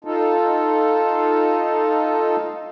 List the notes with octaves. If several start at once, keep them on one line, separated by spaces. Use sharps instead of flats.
D#4 F4 A4